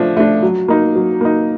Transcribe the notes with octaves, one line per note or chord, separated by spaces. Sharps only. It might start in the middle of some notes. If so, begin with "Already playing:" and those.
Already playing: F3 A3 D4
A3 D4
F#3
A#3 D#4
F#3
A#3 D#4